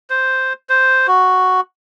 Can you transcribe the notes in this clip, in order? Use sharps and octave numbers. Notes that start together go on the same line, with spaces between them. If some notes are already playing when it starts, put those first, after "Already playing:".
C5
C5
F#4